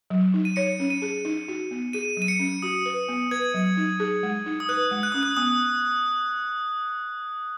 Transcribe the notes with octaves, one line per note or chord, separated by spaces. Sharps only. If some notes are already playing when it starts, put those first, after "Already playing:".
F#3
D#4
D#7
C#5 C#7
C#4
D#7
G#4
D#4
F#4
B3
G#4 D#7
F#3
D#7
C#7
C#4
F#4 D#6
B4
B3
B4 G#6
F#3
D#4
G#4
G#3
D#4
D#6
B4 F#6
G#3
F#6
C#4 D#6
F#6
B3 D#6